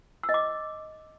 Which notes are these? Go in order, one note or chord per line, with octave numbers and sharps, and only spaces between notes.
E6
D#5
D6